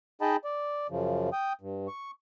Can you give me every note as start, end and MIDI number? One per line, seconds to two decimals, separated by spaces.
0.21 0.36 63
0.21 0.36 68
0.21 0.36 75
0.21 0.36 79
0.21 0.36 81
0.21 0.36 83
0.45 0.87 74
0.90 1.30 42
0.90 1.30 49
0.90 1.30 53
1.33 1.53 79
1.33 1.53 87
1.61 1.88 43
1.88 2.11 85